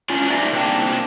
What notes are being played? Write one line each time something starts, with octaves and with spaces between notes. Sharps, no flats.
C#4 D4 F4
D#4 G4 A#4 D5 E5
C3 A#3 D4 D5 G5 A5